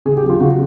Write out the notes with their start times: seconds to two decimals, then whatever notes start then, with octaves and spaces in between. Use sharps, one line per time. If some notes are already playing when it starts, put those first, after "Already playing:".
0.05 C#3 G#4
0.17 G4
0.23 F#3
0.30 F4
0.40 C#3 F#4